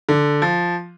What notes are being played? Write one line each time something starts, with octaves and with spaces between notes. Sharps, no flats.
D3
F3